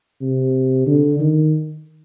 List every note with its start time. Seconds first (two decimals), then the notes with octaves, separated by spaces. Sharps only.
0.21 C3
0.87 D3
1.19 D#3